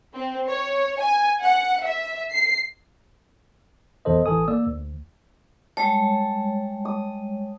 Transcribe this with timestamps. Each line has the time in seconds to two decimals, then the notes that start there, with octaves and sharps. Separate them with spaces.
0.15 C4
0.49 C#5
1.00 G#5
1.43 F#5
1.84 E5
2.31 C7
4.05 G1 E2 E3 A4 C5 D#5
4.26 A1 E3 A4 G#5 D#6
4.48 A#3 D5 E6
4.67 D2
5.77 G3 G#3 C#5 A5
6.85 D#6